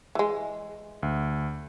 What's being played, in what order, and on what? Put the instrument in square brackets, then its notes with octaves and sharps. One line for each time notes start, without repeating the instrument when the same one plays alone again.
[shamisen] E3 G#3
[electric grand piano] D2